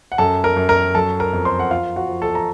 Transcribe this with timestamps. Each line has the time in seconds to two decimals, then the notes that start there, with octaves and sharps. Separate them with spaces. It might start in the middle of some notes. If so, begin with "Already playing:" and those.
0.12 F#5
0.18 F#2 A4 A5
0.44 A#4 A#5
0.56 F#2
0.69 A#4 A#5
0.94 F#3 A4 A5
1.20 A#4 A#5
1.33 F2
1.45 C5 C6
1.60 F#5
1.71 F3 F4 F5
1.96 F#4 F#5
2.09 F3
2.22 A4 A5
2.35 A#5